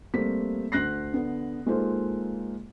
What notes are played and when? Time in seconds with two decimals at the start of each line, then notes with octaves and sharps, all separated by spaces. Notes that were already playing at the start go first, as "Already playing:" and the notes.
0.14 G3 A3 A#3 C4 B6
0.72 D2 F#6 A#6 C7
1.14 D3 B3
1.66 G#3 A#3 D#4 F4 A4 C5